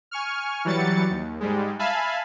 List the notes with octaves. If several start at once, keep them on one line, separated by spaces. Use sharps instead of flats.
G#5 C#6 F6
E3 F#3 G3 A6 C#7
D#2
G#2 G3 G#3
E5 F5 G#5 A5 B5